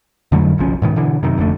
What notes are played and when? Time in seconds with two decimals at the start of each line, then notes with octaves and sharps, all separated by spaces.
0.32 F2 D3 F#3 A3
0.58 F#1 B1 F3 C#4
0.82 G#2 B2 D#3
0.96 B2 D3 E3
1.23 F#2 C3 D#3
1.37 F1 F2 D3 A3